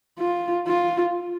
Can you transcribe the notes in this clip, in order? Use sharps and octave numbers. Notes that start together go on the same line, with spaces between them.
F4
F4